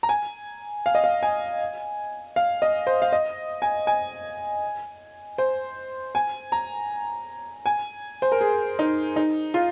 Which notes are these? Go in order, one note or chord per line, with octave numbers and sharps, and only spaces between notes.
A#5
G#5
F5
D#5
F5
G#5
F5
D#5
C5
F5
D#5
G#5
G#5
C5
G#5
A#5
G#5
C5
A#4
G#4
D#4
D#4
F4